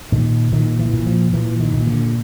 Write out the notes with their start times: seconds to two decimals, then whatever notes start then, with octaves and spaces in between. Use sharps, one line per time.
0.12 A#2 D#3
0.52 A#2 D#3
0.79 E3
0.93 A#2
1.06 F3
1.33 A#2 E3
1.60 D#3
1.73 A#2
1.87 D3